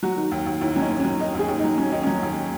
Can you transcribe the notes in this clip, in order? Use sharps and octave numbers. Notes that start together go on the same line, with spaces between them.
F#3 F#4
D#3
D#2
D#2
D#2 E4
F#3 C#4 D#4
D#2
C#4
F#3
D#3 D#4
D#2
G#4
D#2
D#4
F#3
F#3 C#4
D#2 D#4
F#3 C#4
D#2